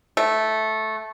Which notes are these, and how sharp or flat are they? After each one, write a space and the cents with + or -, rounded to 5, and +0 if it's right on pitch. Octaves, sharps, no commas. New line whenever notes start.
A3 -10